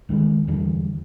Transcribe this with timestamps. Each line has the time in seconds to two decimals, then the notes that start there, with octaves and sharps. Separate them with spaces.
0.09 C#2 D#3 E3 G#3
0.47 E2 D3 E3 G3